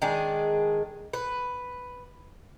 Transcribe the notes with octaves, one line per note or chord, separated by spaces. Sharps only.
D#3 G#3 D4 G#4
B4